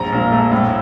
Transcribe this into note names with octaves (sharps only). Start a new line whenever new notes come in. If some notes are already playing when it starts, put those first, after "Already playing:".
Already playing: A#1 A#5
A#2
A3
A2